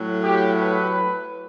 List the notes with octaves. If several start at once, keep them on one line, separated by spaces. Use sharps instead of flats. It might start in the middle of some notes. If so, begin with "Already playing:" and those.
Already playing: A2 F#3
G4
B4